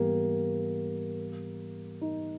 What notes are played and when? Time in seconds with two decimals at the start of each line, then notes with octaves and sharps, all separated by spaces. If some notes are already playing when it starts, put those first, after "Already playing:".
Already playing: G#2 E3 G3 A#3 B3 G4
2.01 D#4